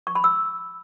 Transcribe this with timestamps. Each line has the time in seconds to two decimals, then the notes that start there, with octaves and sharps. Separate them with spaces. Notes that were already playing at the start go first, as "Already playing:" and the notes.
0.07 C#6
0.15 B5
0.24 E6